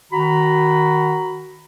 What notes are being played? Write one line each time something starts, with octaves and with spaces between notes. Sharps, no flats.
D#3 F#4 A#5 B5